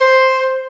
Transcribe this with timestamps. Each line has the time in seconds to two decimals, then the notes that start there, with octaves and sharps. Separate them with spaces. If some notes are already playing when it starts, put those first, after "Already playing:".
0.01 C5